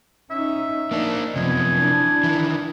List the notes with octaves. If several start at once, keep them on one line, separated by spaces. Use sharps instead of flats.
C#4 D#4 E5
A#3 D4 D#4
F#2 C3 F3 B3 G#4
D4 E4
D#3 E3